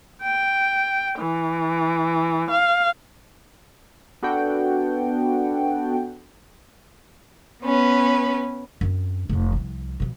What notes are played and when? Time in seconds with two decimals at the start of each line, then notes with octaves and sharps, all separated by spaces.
0.23 G5
1.19 E3
2.51 F5
4.22 B3 D4 F#4 A4 F#5 G5
7.63 B3 C#4 B4
8.81 F#2 C4
9.29 F1 F2
9.52 C2 F3
10.00 B2 F3